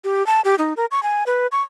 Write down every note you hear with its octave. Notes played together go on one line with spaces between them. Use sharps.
G4
A5
G4
D#4
A#4
C#6
G#5
B4
C#6